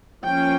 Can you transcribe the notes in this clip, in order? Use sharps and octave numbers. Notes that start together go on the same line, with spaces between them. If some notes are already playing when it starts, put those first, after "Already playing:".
F3 A#3 C#4 G5